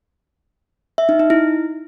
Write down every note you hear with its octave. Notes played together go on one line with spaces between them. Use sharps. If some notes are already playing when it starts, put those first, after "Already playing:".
E5
D#4
D#4
E4